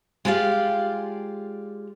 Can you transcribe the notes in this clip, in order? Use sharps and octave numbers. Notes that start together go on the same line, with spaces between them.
G#3 F4 G4 D5 F5